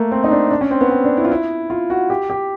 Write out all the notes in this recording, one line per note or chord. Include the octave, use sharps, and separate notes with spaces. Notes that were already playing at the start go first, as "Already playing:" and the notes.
Already playing: A3 A#3
C4
D#4
D4
D4
C#4
C4
B3
C4
D4
E4
F4
E4
F4
F#4
G4
G4